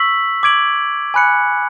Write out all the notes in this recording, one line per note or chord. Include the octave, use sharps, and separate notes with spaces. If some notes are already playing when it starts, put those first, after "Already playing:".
Already playing: C#6 E6 B6 F#7
D6 G#6 D7 F#7
G#5 B5 F#6 C#7